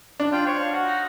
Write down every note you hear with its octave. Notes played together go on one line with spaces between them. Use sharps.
D4
F4 G5
C5 C#5
F5
F#4
D#4